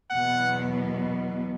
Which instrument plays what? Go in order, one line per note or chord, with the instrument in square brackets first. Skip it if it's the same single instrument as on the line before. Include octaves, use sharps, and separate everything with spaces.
[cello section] E2 B2 F#3 B3 [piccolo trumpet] F#5